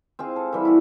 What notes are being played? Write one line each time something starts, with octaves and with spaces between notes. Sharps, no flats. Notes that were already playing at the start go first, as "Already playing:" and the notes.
C4 F4 G#4
A4
E3 G3 E5
E4 F#4